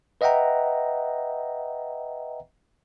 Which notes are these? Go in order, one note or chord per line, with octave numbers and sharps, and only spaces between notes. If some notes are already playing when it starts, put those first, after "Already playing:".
B4 D#5 E5 F#5 G5 A#5